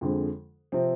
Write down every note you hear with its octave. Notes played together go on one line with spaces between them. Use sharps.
F2 D3 F3 G#3
C3 F3 C4